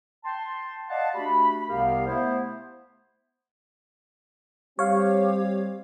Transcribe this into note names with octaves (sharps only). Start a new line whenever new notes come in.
G5 A5 C6
D5 D#5 F5 F#5 A5
A3 D4 F#4 G4 B5
C2 C3 B3 G4 A#4 F5
A3 B3 E4 C5
G3 C4 G4 C#5 F5